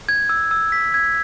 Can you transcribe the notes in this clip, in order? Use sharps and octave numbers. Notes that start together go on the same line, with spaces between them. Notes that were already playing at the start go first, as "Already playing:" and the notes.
G#6
E6
E6
B6
G#6